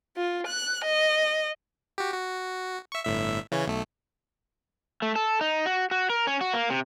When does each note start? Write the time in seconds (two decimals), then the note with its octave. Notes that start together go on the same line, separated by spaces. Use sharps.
0.17 F4
0.46 F#6
0.85 D#5
1.98 F#4 G4
2.13 F#4
2.92 E5 C#6
3.05 G1 A2 E5
3.52 C#3 E3 C#4
3.66 B1 A3
5.02 A3
5.16 A4
5.41 D#4
5.66 F#4
5.91 F#4
6.10 A#4
6.27 C#4
6.41 F#4
6.53 A#3
6.70 C3